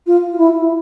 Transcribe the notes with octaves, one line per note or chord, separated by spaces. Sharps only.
F4
F4
E4